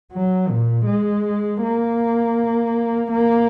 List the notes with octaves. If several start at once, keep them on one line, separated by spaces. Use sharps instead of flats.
F#3
A#2
G#3
A#3
A#3